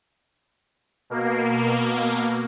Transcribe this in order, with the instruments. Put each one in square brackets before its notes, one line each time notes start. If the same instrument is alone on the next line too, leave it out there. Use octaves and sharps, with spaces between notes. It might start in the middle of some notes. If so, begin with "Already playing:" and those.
[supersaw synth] B2 A#3